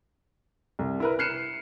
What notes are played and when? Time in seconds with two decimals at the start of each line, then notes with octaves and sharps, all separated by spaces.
0.79 C2
1.00 E4 A#4 B4
1.19 F6 F#6 C7 C#7 D#7 E7